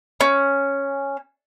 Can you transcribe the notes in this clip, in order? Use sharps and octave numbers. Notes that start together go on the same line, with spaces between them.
C#4